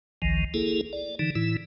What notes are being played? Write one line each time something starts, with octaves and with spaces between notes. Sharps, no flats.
G#1 C#2 D#3 F3
A#3 E4 G#4 A4
D5
D3 E3 D#4
A2 E3 E4